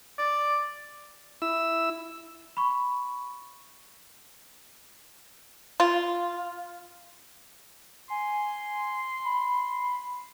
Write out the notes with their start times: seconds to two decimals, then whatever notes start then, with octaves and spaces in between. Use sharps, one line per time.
0.18 D5
1.42 E4 E6
2.57 B5 C#6
5.80 F4
8.10 G#5 C6
9.25 B5